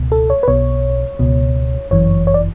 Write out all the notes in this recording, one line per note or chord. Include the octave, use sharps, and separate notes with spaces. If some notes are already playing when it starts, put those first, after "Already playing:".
Already playing: C#2 B2
A4
C#5
B4
B1 B2 C#5
C#2 B2
G1 F#2 E3 C#5
C#5
D5